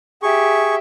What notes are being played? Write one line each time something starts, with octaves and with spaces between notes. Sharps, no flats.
G4 G#4 E5 C#6